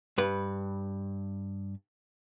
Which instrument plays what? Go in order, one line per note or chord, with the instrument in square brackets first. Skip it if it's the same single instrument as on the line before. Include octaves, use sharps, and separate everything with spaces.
[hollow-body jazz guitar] G2 B4